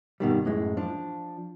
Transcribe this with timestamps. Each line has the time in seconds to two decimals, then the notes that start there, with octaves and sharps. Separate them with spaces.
0.20 G2 B2 D#3 G3
0.45 F#2 A2 E3 G#3
0.77 F3 D4